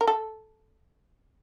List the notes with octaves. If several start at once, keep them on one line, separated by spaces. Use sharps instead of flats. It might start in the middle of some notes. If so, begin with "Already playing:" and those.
A#4
A4